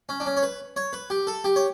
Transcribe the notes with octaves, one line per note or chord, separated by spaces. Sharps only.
C#4
D4
C#4
C#5
B4
C#5
B4
G4
A4
G4
C#5